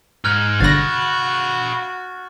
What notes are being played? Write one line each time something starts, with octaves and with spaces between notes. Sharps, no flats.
G#2 F6 F#6 G#6
G1 D3 F#4 F5 B5 A6 A#6